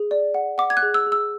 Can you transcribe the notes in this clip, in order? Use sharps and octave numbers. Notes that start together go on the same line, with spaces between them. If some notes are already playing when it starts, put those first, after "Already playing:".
Already playing: G#4
D5
F#5
F#5 D6
G#6
F#6
G#4
E6
G#4
E6